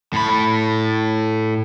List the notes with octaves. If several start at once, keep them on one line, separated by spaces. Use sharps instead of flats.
A2 B5